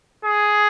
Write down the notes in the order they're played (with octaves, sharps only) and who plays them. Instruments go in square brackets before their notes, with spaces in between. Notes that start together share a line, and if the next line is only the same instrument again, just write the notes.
[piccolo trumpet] G#4